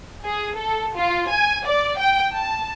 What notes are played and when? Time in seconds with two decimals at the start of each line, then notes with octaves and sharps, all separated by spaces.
0.23 G#4
0.55 A4
0.96 F4
1.29 G#5
1.65 D5
1.98 G5
2.33 A5